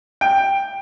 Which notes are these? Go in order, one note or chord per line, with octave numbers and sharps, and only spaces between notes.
G5